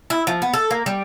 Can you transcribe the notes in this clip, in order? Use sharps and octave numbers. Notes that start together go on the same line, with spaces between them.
E4
F3
B3
A4
A#3
G3